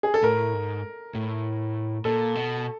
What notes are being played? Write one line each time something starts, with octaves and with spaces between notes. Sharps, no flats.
G#4
A4
A2 A#4
G#2
A2
A#2 A4
B2